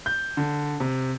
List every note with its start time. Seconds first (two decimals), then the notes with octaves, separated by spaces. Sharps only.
0.06 G6
0.37 D3
0.80 C3